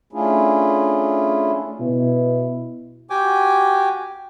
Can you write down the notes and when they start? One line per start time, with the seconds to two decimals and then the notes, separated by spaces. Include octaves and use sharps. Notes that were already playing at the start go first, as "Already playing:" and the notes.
0.13 A3 C#4 D4 E4 F4 G#4
1.80 B2 E4
3.10 F#4 G4 G5 G#5 D6